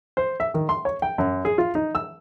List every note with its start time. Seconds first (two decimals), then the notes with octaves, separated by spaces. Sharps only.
0.17 C5
0.40 E5
0.54 D#3
0.69 C6
0.85 C#5
1.02 G5
1.18 F#2
1.45 G#4
1.58 F4
1.75 D#4
1.95 E6